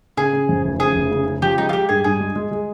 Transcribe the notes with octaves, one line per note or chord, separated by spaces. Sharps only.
C#3 G#4
C#3
F2
F1
C#3 G#4
F1
C#3
C#3
F3 G4
G#3 D#4
F4
G#3 G4
G2 G#4
G2 G#4
G#3
G#3
G#3